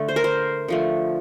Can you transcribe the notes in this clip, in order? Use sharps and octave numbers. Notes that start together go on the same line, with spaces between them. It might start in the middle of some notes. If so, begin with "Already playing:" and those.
Already playing: D3 A3
C5
A#4
C5
D3 F3 A3